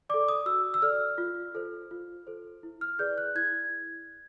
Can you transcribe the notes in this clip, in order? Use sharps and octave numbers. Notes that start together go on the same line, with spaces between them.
A4 D5 D6
D#6
F#4 E6
E6
A4 D5 F6
F4
A4 C5
F4
A4 C5
E4
F6
G#4 B4 D5 G6
F#6
E4 G#6